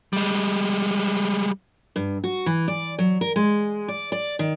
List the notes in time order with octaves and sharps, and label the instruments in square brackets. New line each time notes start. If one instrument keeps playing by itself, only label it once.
[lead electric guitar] G3 G#3
[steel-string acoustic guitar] G2
F#4
E3
D5
F#3
A#4
G#3
D5
D5
D#3